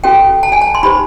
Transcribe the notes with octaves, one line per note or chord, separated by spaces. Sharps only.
C#4 F#4 A4 G5
A5
G#5
A5
C6
D#4 G4 C5 B5